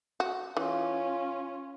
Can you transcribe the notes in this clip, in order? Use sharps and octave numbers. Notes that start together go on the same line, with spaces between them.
F#4
E3 C#4 F4